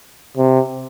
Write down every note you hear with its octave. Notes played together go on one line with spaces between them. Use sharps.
C3